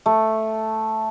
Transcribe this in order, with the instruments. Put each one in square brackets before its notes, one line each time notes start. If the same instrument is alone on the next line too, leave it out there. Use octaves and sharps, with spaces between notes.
[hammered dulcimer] A3